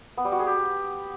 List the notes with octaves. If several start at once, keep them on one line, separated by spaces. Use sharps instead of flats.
B3
G3
F#4
G#4
G4